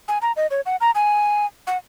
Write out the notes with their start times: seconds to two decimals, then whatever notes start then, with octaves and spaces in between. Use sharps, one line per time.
0.08 G#5
0.22 A#5
0.37 D#5
0.51 C#5
0.66 F#5
0.81 A#5
0.95 G#5
1.67 F#5